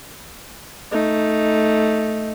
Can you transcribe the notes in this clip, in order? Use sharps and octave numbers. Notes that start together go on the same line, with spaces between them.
A3 D#4